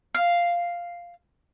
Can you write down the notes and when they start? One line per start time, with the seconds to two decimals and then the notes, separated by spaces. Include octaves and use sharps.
0.15 F5